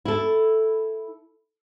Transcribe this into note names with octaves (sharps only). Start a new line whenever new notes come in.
E4 A4